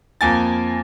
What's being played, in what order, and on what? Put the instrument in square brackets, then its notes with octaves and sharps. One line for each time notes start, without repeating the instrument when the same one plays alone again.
[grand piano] F2 A#3 G#5 A6